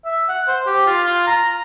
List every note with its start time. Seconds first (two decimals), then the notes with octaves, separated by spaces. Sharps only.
0.05 E5
0.29 F#5
0.47 C5
0.66 G4
0.86 F4
1.04 F4
1.27 A#5